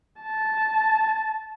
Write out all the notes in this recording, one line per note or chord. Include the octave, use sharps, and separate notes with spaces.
A5